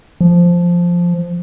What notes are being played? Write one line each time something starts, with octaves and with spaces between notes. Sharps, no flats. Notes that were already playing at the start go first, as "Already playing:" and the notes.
F3